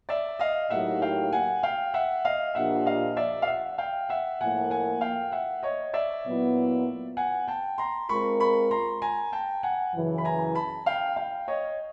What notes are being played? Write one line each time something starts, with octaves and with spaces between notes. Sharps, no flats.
D5 E5
D#5 F5
A2 F#3 A#3 D#4 G4 E5 F#5
F5 G5
F#5 G#5
F5 G5
E5 F#5
D#5 F5
A#2 F3 A#3 D4 G4 E5 F#5
D#5 F5
D5 E5
F5
E5 F#5
F5 G5
E5 F#5
A2 F3 A#3 F#5 G#5
F#5 G#5
F5 G5
E5 F#5
C#5 D#5
D5 E5
A#2 F#3 B3 E4
F#5 G#5
G5 A5
A#5 C6
G#3 C4 F4 A#4 B5 C#6
B5 C#6
A#5 C6
G#5 A#5
G5 A5
F#5 G#5
F#2 C#3 E3
B5
G#5 A#5
A5 B5
F5 G5
F5 G5
C#5 D#5